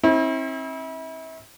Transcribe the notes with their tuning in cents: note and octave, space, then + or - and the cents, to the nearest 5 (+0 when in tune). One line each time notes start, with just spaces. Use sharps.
C4 +40 E4 -35